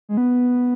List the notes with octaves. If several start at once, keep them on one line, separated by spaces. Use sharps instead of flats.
G#3
B3